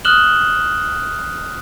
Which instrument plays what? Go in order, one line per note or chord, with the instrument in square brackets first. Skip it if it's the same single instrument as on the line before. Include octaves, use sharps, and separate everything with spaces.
[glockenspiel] D#6 F6 F#6 E7 F#7 G7